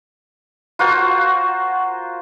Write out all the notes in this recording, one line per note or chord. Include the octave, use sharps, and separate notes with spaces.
F4 F#4 A#4 C5